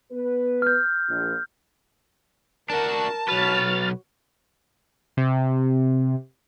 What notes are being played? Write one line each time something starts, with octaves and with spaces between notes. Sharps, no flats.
B3 B4
F6 G6
A#1
D4 F#4 A#4 A5
B1 F#4 B4 C#5 F6 A6
C3